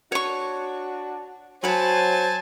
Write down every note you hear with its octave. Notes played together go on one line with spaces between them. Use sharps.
D4 F#4 C#5 C#6
F#3 C5 C#5 G#5 A5 B5